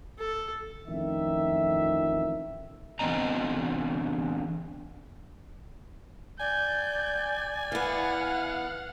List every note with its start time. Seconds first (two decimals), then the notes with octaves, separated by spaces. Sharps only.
0.19 A4
0.88 A1 F2 D#3 E5
2.99 D3 E3 B3 C4 D#5 A#5
6.40 D5 G#5 G6
7.72 E3 B3 F5 F#5